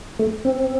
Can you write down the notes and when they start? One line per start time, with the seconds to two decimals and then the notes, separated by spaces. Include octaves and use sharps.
0.19 A3
0.45 C4